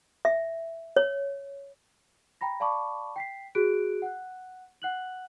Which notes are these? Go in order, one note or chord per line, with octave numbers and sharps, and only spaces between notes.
E5
C#5
G5 A#5 B5 A#6
D5 F5 A5 B5 C#6 D6
G5 B6 C7
F#4 G#4 F#6 D7
F#5 F#6
F#5 F#6 F#7